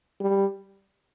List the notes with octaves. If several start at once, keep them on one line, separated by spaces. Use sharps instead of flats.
G3